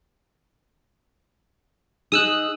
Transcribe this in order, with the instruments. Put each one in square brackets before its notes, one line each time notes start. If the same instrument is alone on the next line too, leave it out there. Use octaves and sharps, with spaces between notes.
[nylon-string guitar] D#4 G#4 [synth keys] D#6 E6 F#6